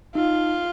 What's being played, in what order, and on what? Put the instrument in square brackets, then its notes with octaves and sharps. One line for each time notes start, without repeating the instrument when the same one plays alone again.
[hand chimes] D#4 [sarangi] F4